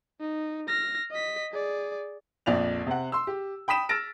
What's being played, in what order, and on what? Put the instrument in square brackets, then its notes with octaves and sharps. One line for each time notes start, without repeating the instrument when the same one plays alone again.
[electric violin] D#4
F6 A#6
D#5 B6
G#4 D5
[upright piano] A#1 F2 D5 F7
C3 F#5
C6 E6
G4
G5 B5 D#6 B6 E7
E6 F6 A6 A#6 D7